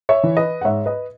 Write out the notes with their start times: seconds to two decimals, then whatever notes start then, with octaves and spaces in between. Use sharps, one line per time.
0.09 C#5 E5
0.24 E3
0.37 B4 D#5
0.61 F#5
0.65 G#2 C#5 E5
0.86 B4 D#5